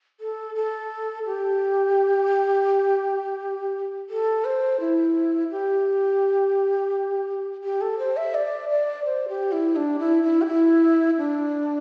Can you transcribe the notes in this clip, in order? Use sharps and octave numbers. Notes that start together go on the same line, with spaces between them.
A4
A4
G4
A4
C5
E4
G4
G4
A4
C5
E5
D5
D5
C5
G4
E4
D4
E4
E4
G4
E4
D4